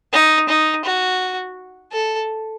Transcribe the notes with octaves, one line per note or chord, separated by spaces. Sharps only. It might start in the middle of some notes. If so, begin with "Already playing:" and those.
D#4
D#4
F#4
A4